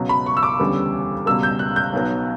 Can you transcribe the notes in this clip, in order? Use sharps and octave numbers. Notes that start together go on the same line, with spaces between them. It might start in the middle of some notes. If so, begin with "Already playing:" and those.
Already playing: C#2 B2 F#3
B5
C#6
E6
D6
E1 D2 C#3 G3 B3
C#2 B2 G3 B3 E6
G6
F#6
G6
B1 B2 F#3 B3